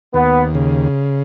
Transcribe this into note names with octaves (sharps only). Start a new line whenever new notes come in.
D#2 B3
C#3